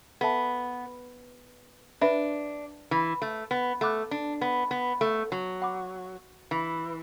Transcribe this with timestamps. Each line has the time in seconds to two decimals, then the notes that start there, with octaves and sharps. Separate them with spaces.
0.21 B3 A4 E5 A5
2.01 D4 B4 E5 B5
2.91 E3
3.22 A3
3.51 B3
3.81 A3 F#5 B5 D6 F#6
4.11 D4
4.41 B3
4.71 B3
5.01 A3
5.32 F#3
5.62 F#5 B5 D6
6.51 E3